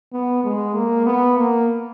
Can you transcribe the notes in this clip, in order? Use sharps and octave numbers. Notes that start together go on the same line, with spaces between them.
B3
G#3
A#3
B3
A#3